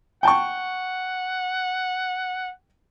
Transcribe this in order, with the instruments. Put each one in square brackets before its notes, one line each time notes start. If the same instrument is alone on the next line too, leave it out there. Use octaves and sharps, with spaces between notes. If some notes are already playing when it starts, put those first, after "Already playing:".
[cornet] F#5 [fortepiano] G5 A5 C#6